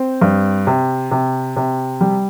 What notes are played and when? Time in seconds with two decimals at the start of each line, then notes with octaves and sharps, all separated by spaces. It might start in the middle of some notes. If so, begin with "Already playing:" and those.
Already playing: C4
0.22 G2
0.67 C3
1.11 C3
1.56 C3
2.01 G3